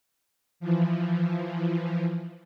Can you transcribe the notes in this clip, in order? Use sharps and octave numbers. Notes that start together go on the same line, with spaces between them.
E3 F3